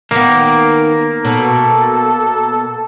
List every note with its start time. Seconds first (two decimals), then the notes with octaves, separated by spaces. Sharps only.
0.11 D#3 A#3 B3
1.25 B2 A4